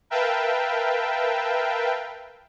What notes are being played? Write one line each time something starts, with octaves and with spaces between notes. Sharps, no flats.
A#4 B4 E5 F5 G5 A5